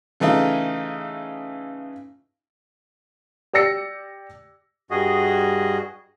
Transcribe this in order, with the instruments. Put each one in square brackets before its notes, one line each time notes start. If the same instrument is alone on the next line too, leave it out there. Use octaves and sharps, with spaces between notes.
[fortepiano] C#3 E3 A3 D#4 F4
[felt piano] G4 D5 E6 A#6 C#7
[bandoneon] G2 G3 F#4 G#4 D#5